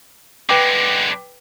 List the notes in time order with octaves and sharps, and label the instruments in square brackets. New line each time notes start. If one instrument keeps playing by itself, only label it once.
[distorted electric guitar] D3 G#3 [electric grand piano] B4 G5 D6